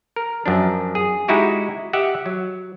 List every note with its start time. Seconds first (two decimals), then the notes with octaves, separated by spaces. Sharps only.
0.16 A#4
0.46 F#2 F3 D4
0.95 G#4
1.28 G#3 D#4 E4 F#4 G4
1.93 G4 D#5 E5 F#5
2.26 F#3